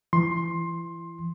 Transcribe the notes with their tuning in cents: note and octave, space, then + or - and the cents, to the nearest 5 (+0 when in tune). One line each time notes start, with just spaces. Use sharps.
E3 +30 C6 +15